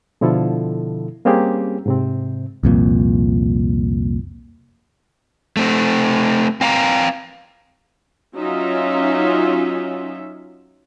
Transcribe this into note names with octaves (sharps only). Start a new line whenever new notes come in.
B2 D3 F3 E4 F4 A4
G3 A#3 C4 C#4 G4 G#4
G#2 C3 C4
C2 F2 A#2
A3 C4
C4 F5 A#5
F#3 C#4 D#4 F4 E5